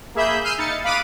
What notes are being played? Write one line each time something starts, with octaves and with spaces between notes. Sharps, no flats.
A#3 G#4 E5 B5 G6
E6 F6 G6 C7 D#7
D#4 A6 C#7
F5 B5 D6 D#6 F#6 D#7